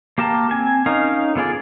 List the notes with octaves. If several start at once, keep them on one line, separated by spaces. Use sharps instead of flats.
A#3 G4 A#4 A5
C4 G#5
C#4 D#4 A#4 F5
D3 B3 F4 G#4 D5